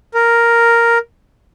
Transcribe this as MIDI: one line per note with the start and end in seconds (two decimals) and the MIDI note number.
0.14 0.98 70